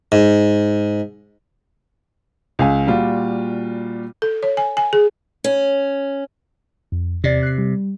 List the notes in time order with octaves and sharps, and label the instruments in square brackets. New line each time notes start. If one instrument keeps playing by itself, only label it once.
[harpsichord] G#2
[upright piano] C#2 F5 G#5
A#2 G3 F4 F#4
[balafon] A4
C#5
G#5
G#5
G#4
[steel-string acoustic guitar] C#4
[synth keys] F2
[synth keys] E2 D5 A6 [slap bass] C3
[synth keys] F#6 C7
G3